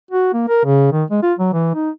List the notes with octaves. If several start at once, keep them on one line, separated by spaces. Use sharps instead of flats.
F#4
A#3
A#4
C#3
D#3
G#3
F4
F#3
E3
D#4